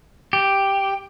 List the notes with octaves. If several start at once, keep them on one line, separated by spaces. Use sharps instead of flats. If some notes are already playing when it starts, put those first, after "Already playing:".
G4